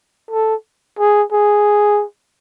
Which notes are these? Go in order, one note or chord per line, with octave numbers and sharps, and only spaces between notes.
A4
G#4
G#4